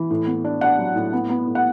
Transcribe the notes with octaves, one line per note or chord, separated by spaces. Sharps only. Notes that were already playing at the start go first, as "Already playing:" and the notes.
Already playing: E3
A2
B3
D4
D4 F#5
F#3
A2
B3
B3
A2
F#5